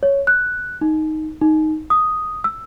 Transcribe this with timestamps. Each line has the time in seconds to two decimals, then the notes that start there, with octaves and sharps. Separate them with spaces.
0.03 C#5
0.27 F#6
0.81 D#4
1.41 D#4
1.90 D#6
2.44 E6